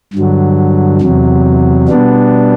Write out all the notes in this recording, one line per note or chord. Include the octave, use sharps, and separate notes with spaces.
G2 D3 F#3
E2 C3 F#3
B2 G3 B3 D4